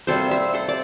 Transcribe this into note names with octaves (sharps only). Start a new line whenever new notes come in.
C3 G3 A#3 A4 C5
C5 E5
A4 C5
D5